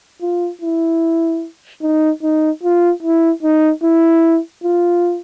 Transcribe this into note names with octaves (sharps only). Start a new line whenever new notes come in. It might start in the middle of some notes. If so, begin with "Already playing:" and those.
F4
E4
D#4
D#4
F4
E4
D#4
E4
F4